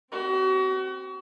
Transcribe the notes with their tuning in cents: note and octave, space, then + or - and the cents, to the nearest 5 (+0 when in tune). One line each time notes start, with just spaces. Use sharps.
C4 +5 F#4 +35